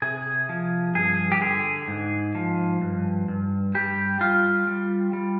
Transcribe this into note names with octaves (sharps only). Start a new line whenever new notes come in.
C3 G#4
F3
G2 G#4
G4
D3 G#4
G#2
F3
G2
G2
G3 G4
G3 F4
G3
G3